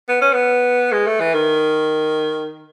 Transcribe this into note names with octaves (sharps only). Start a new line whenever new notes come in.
B3
C#4
B3
G#3
A3
E3
D#3